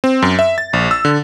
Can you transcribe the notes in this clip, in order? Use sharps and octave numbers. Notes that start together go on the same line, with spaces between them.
C4
F#2
E5
A6
A#1
E6
D3